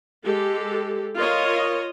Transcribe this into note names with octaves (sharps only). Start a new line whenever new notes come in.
G#3 G4 A4
F4 A#4 C#5 D#5